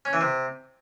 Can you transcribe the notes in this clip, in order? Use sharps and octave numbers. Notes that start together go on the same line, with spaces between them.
C#4
E3
C3